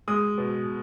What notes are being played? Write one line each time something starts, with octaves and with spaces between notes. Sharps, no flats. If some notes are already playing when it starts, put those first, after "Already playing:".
G#3 D#6
B2